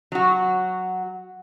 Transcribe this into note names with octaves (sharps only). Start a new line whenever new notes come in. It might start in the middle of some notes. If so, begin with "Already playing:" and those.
F#3 F#4